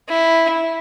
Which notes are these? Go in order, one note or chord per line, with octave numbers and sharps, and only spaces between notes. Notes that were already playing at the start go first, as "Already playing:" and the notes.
E4